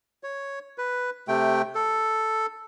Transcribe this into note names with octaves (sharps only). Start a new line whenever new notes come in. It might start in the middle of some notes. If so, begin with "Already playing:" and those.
C#5
B4
C3 A3 G5
A4